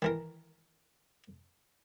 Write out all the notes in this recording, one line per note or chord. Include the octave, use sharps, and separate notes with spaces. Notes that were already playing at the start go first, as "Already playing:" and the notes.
D#3 E3 A#4